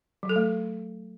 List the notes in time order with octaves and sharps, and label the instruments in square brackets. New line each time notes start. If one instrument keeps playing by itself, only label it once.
[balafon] F#3
A4
A3